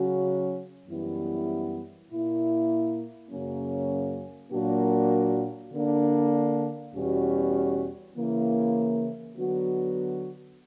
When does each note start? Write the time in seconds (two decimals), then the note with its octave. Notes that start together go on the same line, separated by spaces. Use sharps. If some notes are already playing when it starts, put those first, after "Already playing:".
Already playing: C#3 F#3 C#4 F#4
0.88 F#2 E3 G3 B3 E4
2.09 A#2 A#3 E4
3.30 F#2 C#3 F#3 A#3 C#4
4.51 A#2 F#3 A#3 D4 F#4
5.72 D3 A#3 D4
6.94 E2 B2 G3 C#4 F#4
8.15 C#3 E3 A#3 E4
9.37 D3 F#3 B3 F#4